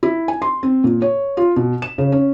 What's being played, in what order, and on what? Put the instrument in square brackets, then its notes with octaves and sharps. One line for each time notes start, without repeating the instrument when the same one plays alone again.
[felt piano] E4
G#5
C6
C4
A#2
C#5
F4
B2
E7
C#3
C#4